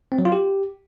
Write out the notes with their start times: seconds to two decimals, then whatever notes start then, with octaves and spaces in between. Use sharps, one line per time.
0.12 C4
0.19 F#3
0.25 F4
0.32 G4